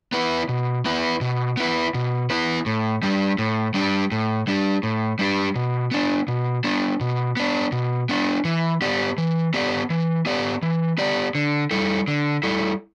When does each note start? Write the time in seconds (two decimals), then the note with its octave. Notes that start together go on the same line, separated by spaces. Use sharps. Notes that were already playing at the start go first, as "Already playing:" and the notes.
0.12 B3 E4 B4
0.49 B2
0.85 B3 E4 B4
1.21 B2
1.57 B3 E4 B4
1.94 B2
2.30 B3 E4 B4
2.66 A2
3.03 G3 D4 G4
3.38 A2
3.74 G3 D4 G4
4.12 A2
4.47 G3 D4 G4
4.83 A2
5.19 G3 D4 G4
5.55 B2
5.91 B3 D4
6.28 B2
6.64 B3 D4
7.01 B2
7.37 B3 D4
7.72 B2
8.09 B3 D4
8.45 E3
8.81 B3 G4 D5
9.18 E3
9.54 B3 G4 D5
9.90 E3
10.26 B3 G4 D5
10.62 E3
10.98 B3 G4 D5
11.35 D3
11.71 G3 E4 A4
12.08 D3
12.43 G3 E4 A4